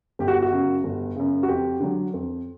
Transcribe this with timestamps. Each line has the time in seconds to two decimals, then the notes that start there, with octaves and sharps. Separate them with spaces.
0.19 G1 G4
0.28 F#4
0.42 F#4
0.51 F#2 C#3
0.84 G1
1.16 F#2 C#3
1.43 F#4
1.48 F2 G4
1.80 D3 F#3
2.14 F2